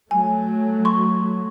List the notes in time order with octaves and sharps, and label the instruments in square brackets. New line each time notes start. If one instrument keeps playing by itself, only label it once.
[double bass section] F#3 A3 [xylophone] G#5
[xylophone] C6 C#6